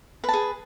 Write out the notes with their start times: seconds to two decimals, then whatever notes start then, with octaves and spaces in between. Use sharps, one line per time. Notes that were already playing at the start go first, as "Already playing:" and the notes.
0.24 B4
0.29 A5
0.33 G#4